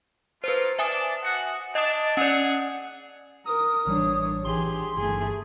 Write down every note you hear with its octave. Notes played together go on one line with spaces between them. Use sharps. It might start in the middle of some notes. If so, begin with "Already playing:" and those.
A3 A#3 F4 B4 C5
D4 D5 E5 G#5 A5 D#6
F#4 F#5
D4 D#5 A5 D#6
C#4 G#4 D5 F#5
A#4 D#6
A1 E3 G3 D4 C#5
A#1 E3 G4 G#4 C6
G1 E3 A3 G#4